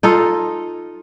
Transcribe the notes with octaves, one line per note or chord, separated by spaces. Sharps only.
D#4 F4 A4